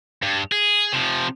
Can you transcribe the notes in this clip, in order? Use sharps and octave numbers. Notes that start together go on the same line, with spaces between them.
G2
G#4
C3 F3